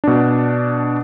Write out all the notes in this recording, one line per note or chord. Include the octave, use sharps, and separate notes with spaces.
B2 D4